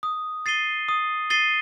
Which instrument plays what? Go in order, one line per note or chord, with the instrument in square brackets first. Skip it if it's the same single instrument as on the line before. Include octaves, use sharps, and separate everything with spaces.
[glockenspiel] D#6
A6 C7 D#7 G7
D#6
A6 C7 D#7 G7